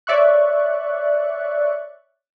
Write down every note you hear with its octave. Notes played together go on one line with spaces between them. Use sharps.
C#5 D5 E5 C#6 F#6